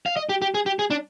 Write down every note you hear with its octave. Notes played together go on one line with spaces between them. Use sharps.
F5
D#5
G4
G4
G#4
G4
G#4
D4